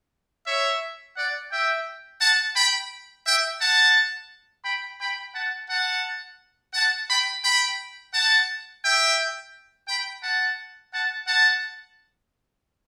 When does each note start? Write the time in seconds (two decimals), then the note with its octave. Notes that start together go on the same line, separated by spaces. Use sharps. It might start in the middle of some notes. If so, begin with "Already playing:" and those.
0.46 C#5 E5
1.16 D5 F#5
1.52 E5 G5
2.20 F#5 A5
2.56 G5 B5
3.26 E5 G5
3.60 F#5 A5
4.65 G5 B5
5.00 G5 B5
5.35 F#5 A5
5.70 F#5 A5
6.74 F#5 A5
7.09 G5 B5
7.44 G5 B5
8.14 F#5 A5
8.84 E5 G5
9.88 G5 B5
10.23 F#5 A5
10.93 F#5 A5
11.27 F#5 A5